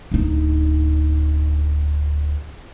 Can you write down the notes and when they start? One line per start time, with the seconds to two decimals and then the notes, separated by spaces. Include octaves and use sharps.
0.12 D1 D#4